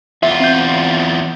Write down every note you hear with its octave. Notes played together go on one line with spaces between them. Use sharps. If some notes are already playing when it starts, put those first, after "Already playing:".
E2 F4 E5
C4 G6